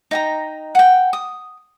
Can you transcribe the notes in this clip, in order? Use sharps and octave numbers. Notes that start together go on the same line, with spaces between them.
D#4 G5 A#5
F#5 G5
D#6